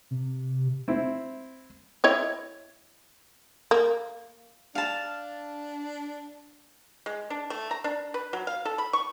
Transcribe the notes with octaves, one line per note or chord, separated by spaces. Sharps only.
C3
C4 E4
E4 C#5 D#5
A#3
D4 F5 A5
G#3
D4
A3
A#5
D4
B4
F#3
F5
A4
B5
C#6